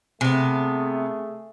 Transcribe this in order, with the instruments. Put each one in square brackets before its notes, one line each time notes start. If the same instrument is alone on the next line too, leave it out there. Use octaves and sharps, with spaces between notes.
[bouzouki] C3 B3 [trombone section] A3 G#4